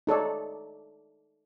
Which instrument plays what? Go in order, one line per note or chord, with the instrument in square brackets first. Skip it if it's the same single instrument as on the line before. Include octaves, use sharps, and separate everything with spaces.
[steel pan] D#4 A4 C#5 D5